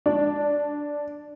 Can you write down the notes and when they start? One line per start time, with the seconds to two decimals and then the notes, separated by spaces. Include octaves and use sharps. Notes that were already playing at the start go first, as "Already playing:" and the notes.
0.06 D4